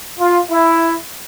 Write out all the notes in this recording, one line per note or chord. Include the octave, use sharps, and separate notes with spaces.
F4
E4